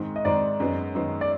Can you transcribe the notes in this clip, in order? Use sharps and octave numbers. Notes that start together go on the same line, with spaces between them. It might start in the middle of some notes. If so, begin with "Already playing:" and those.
Already playing: G#2 D#3 G#3 C4
D#5
G#2 D#3 G#3 C4 D5
F#2 D#3 G#3 B3
F#2 D#3 G#3 B3
D5